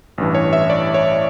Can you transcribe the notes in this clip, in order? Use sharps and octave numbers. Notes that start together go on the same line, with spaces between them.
A1 G2 E3
C#5
E5
D5
C#5